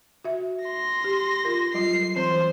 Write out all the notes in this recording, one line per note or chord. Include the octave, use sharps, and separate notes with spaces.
F#4 E5
C6 A#6
G4
F4 A#4
F#3 G3 F4 C7
E3 C4 C5 C6